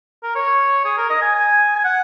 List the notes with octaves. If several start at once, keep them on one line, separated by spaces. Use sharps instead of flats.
A#4
C#5
G#4
A#4
D#5
G#5
G#5
G#5
F#5